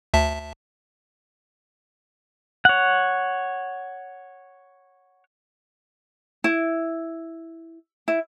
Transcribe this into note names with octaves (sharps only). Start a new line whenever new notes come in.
D2 E5 A5
C#5 F#5
E4
E4